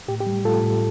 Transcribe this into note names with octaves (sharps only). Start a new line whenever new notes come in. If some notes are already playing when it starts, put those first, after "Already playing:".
A2 G4
G4
G3
A2 F4 A4
A2